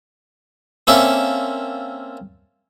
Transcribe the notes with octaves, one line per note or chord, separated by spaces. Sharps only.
A#3 C4 C#4 A4 D5 E5